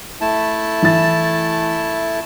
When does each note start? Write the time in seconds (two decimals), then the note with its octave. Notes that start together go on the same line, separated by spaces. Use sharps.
0.21 A3 E4 A5
0.82 E3 A6